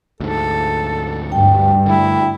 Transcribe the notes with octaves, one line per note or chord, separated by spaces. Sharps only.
D2 G#2 A4
G2 G5
D3 A3 E4